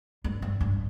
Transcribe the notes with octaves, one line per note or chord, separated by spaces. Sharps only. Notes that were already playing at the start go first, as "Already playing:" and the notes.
G2
G2
G2